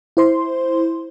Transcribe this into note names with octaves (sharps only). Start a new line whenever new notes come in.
E4 C5 C6